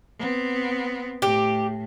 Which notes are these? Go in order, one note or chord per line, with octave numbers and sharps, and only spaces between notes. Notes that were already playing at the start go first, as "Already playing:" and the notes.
B3 C4
A2 G4